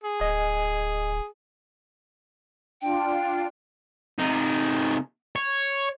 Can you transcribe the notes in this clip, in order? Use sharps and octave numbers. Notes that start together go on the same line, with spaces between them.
G#4
D1 D#5 G#5
D4 F4 G5
C3 D#4
C#5